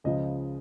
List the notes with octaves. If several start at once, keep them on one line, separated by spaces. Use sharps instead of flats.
C#2 C#3 F3 D#5